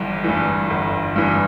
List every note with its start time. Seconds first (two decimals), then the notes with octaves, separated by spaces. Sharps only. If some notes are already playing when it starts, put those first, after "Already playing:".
Already playing: G1 G2 E3
0.24 G2 E3
0.70 G1
1.16 G2 E3